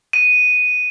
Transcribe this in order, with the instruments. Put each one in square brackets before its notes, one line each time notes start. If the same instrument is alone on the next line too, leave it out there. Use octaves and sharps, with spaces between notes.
[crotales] D#7